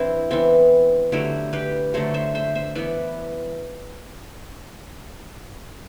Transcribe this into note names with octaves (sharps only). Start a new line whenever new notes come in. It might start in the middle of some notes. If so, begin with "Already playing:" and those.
Already playing: E3 C4 D4 E4
E3 B3 C4
D3 F#3 A3 E4 G4
G4 B4
D3 F#3 A3 A4 C5
C5 E5
C5 E5
C5 E5
E3 B3 B4 D5